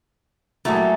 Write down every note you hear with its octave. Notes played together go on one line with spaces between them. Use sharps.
F#3 G3 A3 A#3 E4 G#4